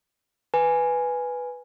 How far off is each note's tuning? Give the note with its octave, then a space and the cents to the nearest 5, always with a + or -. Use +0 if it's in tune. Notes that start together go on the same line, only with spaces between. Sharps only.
B4 +0 G#5 +0